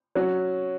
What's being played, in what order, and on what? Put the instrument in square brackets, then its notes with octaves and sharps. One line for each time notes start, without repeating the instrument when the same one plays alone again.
[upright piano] F#3 C#4 F#4